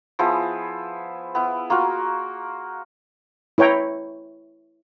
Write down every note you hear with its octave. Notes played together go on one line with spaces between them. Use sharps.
F3 B3 E4 G#4
B3 E4
A#3 F4 F#4 A#4
E4 B4 C#5 G5 A#5